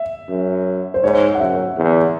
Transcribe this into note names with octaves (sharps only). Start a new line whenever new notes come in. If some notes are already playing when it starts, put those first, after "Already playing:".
Already playing: E5
F#2
C5
G#2 C#5
F#5
F#2 E5
E2